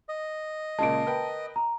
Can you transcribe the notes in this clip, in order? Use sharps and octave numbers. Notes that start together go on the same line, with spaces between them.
D#5
A#2 C#3 G#3 A5 D7
A#4 B4 G5
A#5